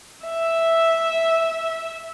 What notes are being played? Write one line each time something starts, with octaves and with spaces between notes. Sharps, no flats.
E5